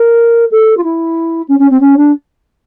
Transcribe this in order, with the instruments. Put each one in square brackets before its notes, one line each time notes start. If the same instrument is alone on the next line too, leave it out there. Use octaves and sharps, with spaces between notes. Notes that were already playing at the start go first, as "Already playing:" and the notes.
Already playing: [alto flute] A#4
A4
F4
E4
C#4
C#4
C4
C#4
D4